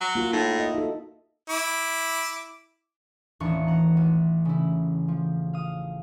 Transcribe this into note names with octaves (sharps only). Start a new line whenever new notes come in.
F#3
A#3 F4 F#4
A2 D#4
D#5 E5
D#4 F#4 A4
E4 D6
D#1 D#2 A2 E3 D4 C#6
F#5 A#5
A1
C#3 E4
F3
F5 D#6